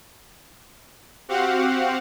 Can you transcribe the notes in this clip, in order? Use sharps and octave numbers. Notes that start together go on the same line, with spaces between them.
C4 F#4 G4 F5 F#5